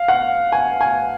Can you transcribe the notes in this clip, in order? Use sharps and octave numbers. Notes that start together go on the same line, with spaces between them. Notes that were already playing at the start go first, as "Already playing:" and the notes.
Already playing: F5
F#5
G#5
G#5